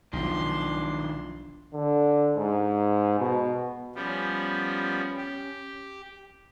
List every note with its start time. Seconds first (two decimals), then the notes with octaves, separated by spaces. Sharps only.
0.13 B1 D#3 F3 D4 C6
1.74 D3
2.37 G#2
3.20 B2
3.95 F3 G3 B3 C#4
5.17 G4